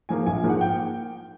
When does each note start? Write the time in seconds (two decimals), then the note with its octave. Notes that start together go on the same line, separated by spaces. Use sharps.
0.09 G#2 F3 A#3 G#5
0.26 A#1 G#5
0.44 G#2 F3 A#3
0.49 F#5
0.61 G5